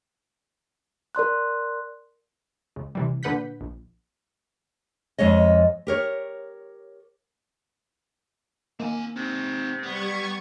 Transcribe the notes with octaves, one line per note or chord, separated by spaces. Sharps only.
A#4 D5 C6 F#6
C#2
C3 E3 G3
A#2 D3 B4 F#5 G6 B6
A#1
F2 G#3 C#5 D#5
G4 A#4 C#5
A#3 C4 G#5
C3 C4 D#4
G3 B3 C#6 G#6